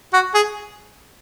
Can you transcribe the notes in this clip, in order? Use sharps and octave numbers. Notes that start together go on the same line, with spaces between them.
F#4
G#4